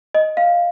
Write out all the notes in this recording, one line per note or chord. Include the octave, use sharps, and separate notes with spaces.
D#5
F5